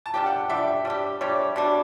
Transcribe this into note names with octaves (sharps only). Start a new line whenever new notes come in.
A5
G3 D4 G4 G5
F#5
G3 D4 G4 E5
G3 D4 G4
G3 D4 G4 C#5
B2 G3 D4